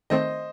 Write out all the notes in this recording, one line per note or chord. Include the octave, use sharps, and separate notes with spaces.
D#3 A3 C4 C5 D#5